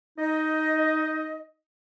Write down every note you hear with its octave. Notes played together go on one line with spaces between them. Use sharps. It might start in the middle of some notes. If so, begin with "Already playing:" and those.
D#4 D#5